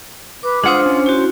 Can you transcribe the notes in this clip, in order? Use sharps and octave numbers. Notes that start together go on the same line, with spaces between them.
B4 D6
G#3 D4 F4 C5 F#5 D#6
C#4
E4 F#4 C5